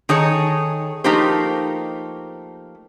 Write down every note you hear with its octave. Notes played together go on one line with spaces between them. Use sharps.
D#3 D#4 G#4 A4 C#5
F3 A3 A#3 D#4 G4 C5